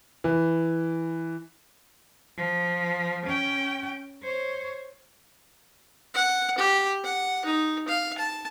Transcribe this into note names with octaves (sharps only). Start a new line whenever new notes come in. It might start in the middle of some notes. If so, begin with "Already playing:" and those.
E3
F3
C#4 G5
C5 C#5
F#5
G4
F#5
D#4
F5
A5